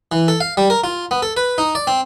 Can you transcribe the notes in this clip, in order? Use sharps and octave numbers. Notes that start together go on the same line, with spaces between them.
E3
A4
F5
G3
A#4
F4
B3
A4
B4
D#4
D5
C4